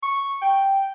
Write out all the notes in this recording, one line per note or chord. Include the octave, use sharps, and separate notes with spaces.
C#6
G5